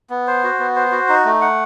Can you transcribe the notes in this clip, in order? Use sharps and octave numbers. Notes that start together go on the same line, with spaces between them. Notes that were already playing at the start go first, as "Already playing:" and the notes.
B3
C5
F#4
B3
C5
F#4
D#4
A3
F#5